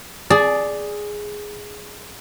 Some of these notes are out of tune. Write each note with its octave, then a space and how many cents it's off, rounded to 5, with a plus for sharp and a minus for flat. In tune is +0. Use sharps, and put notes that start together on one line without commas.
G#4 +0 D5 +0 A5 -40